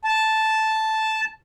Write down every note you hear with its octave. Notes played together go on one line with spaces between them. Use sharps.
A5